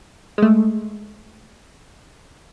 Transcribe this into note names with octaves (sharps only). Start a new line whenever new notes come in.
G#3 A3